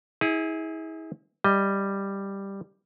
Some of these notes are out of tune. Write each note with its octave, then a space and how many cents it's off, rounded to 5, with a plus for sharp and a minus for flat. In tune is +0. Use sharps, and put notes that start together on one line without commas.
E4 -35 G#4 +0
G3 +5 D#5 +15